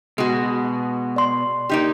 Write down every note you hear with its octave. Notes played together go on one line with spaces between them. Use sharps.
B2 G#3 F#4
D5 C6
A#3 D#4 G4